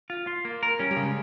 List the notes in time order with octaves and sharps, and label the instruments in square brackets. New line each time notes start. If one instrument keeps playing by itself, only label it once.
[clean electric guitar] F4
F4
A#3
A#4
[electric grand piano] G3 [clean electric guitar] C#4
[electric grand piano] G3
[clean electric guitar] C#3
[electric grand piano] G#3